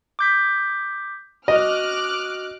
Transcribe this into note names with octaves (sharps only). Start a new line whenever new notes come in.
D6 G6 B6
F#4 D#5 D6 F6 F#6